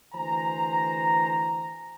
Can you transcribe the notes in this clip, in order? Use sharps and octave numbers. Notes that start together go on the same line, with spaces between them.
D2 E3 C5 G#5 A#5